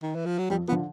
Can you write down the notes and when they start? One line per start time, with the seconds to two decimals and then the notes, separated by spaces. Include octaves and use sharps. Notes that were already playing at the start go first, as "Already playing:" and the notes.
0.03 D#3
0.15 E3
0.26 F3
0.38 F#3
0.50 F2 G3
0.68 F3 B3
0.72 D3